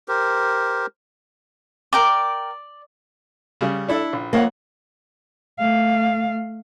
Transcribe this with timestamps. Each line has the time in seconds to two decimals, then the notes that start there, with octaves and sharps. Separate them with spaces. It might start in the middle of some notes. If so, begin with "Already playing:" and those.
0.08 G4 A#4 C5
1.93 A#4 D5 G5 D6
3.61 C#3 G3
3.88 D4 E4 A4
4.13 A#1
4.33 F2 A#3 C#5 F#5
5.59 A3 F5